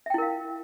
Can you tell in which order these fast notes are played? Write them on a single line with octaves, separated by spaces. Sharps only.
E5 G5 E4 A#4 F5